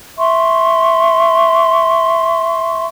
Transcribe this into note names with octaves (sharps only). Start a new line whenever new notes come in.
E5 C6 C#6